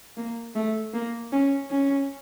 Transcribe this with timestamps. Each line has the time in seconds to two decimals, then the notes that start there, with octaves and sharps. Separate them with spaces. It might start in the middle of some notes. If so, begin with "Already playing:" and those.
0.17 A#3
0.56 A3
0.94 A#3
1.32 C#4
1.71 C#4